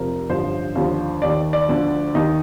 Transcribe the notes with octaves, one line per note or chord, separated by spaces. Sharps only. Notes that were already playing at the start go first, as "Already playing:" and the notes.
Already playing: F1 F2 C3 F3 A#4
A1 G2 D3 F3 C5
D#2 D3 F3
D#2 D#3 D5
D5
D2 D3 F3
D#2 D#3 D#4